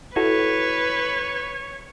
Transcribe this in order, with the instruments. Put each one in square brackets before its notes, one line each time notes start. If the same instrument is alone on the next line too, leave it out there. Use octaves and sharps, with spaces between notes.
[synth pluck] E4 F#4 A4 [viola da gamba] B4 [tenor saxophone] C#5